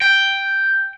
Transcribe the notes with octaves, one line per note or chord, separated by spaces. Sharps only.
G5